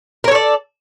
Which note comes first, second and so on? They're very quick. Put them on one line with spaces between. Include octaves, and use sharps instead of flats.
A#4 C#5 A4 D5